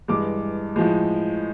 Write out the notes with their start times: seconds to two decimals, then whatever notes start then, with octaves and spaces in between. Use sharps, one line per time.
0.08 G2 E3 G#3 D6
0.76 A2 F3 G#3